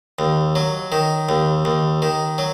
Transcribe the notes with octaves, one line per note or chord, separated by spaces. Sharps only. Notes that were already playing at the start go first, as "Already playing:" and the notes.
D#2
F#3
D#3
D#2
D#2
D#3
F#3